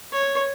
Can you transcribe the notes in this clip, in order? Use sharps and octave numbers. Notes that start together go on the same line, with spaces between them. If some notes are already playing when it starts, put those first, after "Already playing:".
C#5